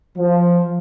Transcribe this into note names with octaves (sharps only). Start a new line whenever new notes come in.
F3